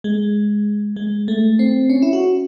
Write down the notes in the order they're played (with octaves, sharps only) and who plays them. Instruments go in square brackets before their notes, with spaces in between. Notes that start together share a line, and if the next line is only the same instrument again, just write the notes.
[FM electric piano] G#3
G#3
A3
C4
C#4
E4
F#4